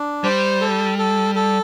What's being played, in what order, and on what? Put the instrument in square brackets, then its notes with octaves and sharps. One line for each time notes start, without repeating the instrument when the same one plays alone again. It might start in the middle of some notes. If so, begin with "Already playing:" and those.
Already playing: [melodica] D4
[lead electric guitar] G3 [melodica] C5
[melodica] A4
A4
A4